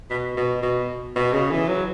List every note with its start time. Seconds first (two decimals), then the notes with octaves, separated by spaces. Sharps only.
0.10 B2
0.37 B2
0.62 B2
1.16 B2
1.33 C#3
1.51 E3
1.68 F#3